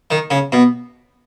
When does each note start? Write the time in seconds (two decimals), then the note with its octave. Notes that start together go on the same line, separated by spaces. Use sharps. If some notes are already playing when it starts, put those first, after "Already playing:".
0.11 D#3
0.31 C#3
0.52 B2